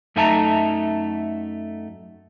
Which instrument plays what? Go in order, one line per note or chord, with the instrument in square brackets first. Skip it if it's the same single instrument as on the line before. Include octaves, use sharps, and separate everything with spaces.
[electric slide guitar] F#2 A3 D#4 E5 A5 A#5